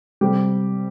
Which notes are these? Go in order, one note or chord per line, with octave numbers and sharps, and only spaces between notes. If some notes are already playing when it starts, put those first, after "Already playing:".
C3 G3 G4